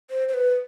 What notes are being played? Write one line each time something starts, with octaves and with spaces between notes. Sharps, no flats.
C5
C5
B4